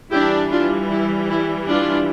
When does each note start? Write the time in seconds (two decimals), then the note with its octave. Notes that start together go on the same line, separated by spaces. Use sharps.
0.10 E3 G3 D4 E4 G4
0.50 D4 F4
0.90 E4
1.29 E4
1.68 D4 F4